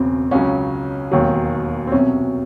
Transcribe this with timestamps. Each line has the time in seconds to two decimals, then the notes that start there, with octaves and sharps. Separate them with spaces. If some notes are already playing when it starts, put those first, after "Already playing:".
Already playing: E1 E2 C#3 F#3 C4
0.31 C#2 C#3 F#3 C#4
1.12 E1 D#2 D#3 F#3
1.87 C4
1.92 C2 B2 F#3 C#4